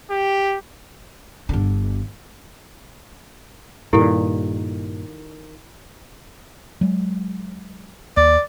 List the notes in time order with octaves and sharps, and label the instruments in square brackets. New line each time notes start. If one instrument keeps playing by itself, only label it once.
[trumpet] G4
[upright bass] G1 D3
[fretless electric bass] G2 A#2 [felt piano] D#3 A#4 [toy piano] E4 G4 A4
[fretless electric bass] F#3 G#3
[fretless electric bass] D#2 [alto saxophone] D5